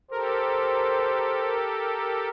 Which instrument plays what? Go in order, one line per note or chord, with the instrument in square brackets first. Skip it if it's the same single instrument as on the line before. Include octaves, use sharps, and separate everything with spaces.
[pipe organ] G4 A4 [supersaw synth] A#4 [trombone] C5